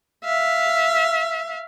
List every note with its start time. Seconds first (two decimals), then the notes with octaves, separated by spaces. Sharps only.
0.24 E5 F5